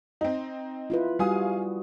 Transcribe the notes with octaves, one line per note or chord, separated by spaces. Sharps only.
C4 D#4
E4 F4 B4
G3 F#4 F5 G#5 D#6